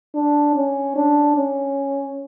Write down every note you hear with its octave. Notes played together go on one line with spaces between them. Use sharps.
D4
C#4
D4
C#4